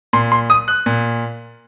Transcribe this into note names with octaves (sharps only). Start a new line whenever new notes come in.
A#2 C6
C6
D#6
F#6
A#2